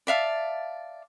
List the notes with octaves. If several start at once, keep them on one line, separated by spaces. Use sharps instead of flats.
D5 E5 F5 A5